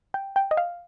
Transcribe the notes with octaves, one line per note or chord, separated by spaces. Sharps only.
G5
G5
D#5
F5